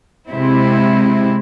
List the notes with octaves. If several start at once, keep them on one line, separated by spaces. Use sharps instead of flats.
C3 G#3 C4 E4